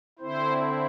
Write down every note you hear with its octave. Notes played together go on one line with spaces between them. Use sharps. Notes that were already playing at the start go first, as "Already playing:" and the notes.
D3 C4 E4 C5